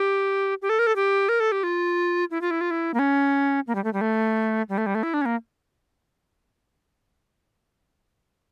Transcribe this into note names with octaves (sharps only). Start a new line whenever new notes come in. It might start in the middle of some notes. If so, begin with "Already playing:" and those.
Already playing: G4
G4
A4
A#4
A4
G4
A#4
A4
G4
F4
E4
F4
E4
F4
E4
A#3
C#4
A#3
G3
A3
G3
A3
G3
A3
G3
A3
E4
D4
C#4
A#3